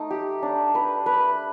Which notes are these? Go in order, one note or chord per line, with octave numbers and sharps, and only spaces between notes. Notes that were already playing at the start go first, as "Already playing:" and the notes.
Already playing: A3 D#4
G4
D4
B4
B4